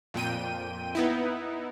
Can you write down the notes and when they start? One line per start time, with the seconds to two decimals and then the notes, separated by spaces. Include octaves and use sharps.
0.14 F2 A#2 G5 D#7
0.95 B3 D#4 E4